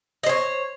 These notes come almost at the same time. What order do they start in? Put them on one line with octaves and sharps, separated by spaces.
D#5 C5 C#5